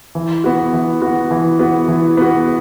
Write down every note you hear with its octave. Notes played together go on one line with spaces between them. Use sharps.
E3
B3 F#4
E3
B3 F#4
E3
B3 F#4
E3
B3 F#4